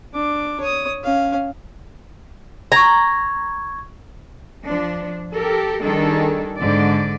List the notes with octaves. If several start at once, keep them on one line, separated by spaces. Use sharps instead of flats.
D4 D6
C#5 D#6
C#4 F5
A#5 C#6 G#6
F3 D4
G4 A4 A#4
D#3 G3 D4 G#4 A4
G#2 D3 D5